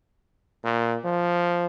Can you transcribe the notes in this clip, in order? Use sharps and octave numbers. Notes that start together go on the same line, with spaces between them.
A#2
F3